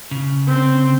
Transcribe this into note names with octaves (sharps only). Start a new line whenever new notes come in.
C#3
C4